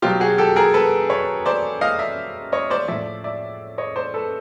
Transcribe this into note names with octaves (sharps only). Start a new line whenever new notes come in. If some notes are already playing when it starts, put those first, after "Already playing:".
B2 F#3 F4 G4
F#4 G#4
G4 A4
G#4 A#4
A4 B4
B4 C#5
C5 D5
D#5 F5
D5 E5
C#5 D#5
C5 D5
A2 F3 D5 E5
D5 E5
C#5 D#5
C5 D5
A4 B4